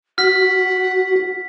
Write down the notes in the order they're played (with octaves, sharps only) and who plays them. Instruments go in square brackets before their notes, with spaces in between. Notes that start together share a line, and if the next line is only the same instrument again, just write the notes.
[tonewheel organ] F#4 [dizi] F#5 [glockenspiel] F6 B6